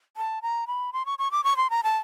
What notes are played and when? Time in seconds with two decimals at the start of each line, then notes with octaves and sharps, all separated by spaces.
0.17 A5
0.42 A#5
0.67 B5
0.93 C6
1.06 C#6
1.19 C#6
1.31 D6
1.44 C#6
1.57 C6
1.70 A#5
1.84 A5